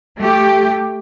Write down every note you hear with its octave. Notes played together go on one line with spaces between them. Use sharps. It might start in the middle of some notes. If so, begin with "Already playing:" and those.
A3 G4